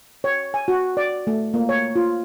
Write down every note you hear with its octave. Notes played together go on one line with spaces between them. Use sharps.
C#5
G#5
F#4
D5
A3
A#3
C#5
F4